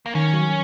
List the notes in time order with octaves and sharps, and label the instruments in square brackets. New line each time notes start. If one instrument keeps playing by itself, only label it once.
[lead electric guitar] A#3
[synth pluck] D#3 [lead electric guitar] C#4
[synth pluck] F#3